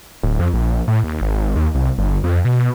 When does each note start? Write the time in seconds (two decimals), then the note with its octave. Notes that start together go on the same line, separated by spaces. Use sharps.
0.23 D1
0.40 F2
0.54 A#1
0.88 A2
1.04 D#2
1.21 G#1
1.56 D#2
1.75 C2
1.98 G1
2.24 F2
2.45 B2